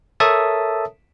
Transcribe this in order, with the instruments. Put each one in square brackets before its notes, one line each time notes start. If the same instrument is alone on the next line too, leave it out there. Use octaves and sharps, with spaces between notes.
[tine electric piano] A4 A#4 C#5 E5 A5 D#6